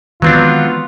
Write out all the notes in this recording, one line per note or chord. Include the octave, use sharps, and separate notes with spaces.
D#3 E3 F#3 G#3 B3 C4 D4 F4